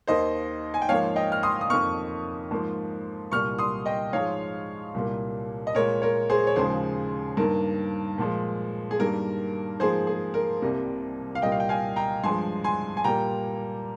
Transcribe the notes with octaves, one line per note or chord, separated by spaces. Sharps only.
D#2 D#3 A#3 C5 D#5
G#5
G5
G#2 F3 A#3 C#5 F5
D#5 G5
F6
C6 D#6
D#6
F2 D#3 A#3 C#6 F6
G#2 F3 A#3
C2 A#2 G3 A#3 C#6 F6
C6 D#6
D#5 G5
G#2 F3 G#3 C#5 F5
C2 A#2 G3 A#3
D#5
A#2 G#3 A#4 C#5
A#4 C#5
G#4 C5
C#5
D#2 C#3 F3 G#3 G#4 C5
G2 D#3 A#3 A#4
A#2 F3 G#3
G#4
G2 D#3 G3 A#3 A#4
G#2 F3 A#3 G#4 C5
G#4
A#4
C2 C3 G3 A#3
F5
C2 A#2 G3 A#3 D#5 G5
F5
G5
F5 G#5
G5 A#5
G2 F3 G#3 G#5 C6
G#5 C6
G#5
A#2 G3 A#3 G5 A#5